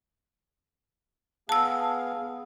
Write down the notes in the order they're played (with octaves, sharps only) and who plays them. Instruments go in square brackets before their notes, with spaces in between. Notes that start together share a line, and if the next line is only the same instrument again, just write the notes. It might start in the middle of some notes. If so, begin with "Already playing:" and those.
[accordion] B3 G#4 F5 [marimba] A5 E6